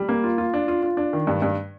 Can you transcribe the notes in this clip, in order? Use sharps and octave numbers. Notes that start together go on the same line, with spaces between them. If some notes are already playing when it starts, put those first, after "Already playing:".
Already playing: G3
A#3
F4
F4
D4
F4
F4
D4
D#3
G2
G2